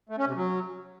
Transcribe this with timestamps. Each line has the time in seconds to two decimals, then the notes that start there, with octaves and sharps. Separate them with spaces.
0.09 A3
0.18 C#4
0.27 C3
0.35 F#3